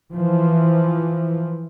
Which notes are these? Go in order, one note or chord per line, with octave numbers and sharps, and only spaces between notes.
E3 F3